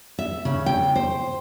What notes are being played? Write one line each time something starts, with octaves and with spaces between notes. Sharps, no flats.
E5
C#3
G5
C5